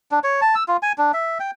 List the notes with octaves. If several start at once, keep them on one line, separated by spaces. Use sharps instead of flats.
D4
C#5
A5
E6
F4
G#5
D4
E5
G5